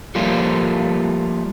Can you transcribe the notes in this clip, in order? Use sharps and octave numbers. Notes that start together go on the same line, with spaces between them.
F3 G3 A3 A#3 F4